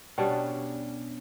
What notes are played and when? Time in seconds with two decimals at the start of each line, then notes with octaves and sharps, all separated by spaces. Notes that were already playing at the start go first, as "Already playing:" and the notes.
0.18 B2 G3 C#4 D4